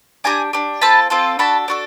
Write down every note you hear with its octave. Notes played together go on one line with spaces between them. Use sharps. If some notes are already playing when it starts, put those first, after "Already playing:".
D4 G4 G#5 A#5
D4 G4
C4 F4 A4 A5 B5
C4 F4 A4
D4 F#4 A4 A5 B5
D4 F#4 A4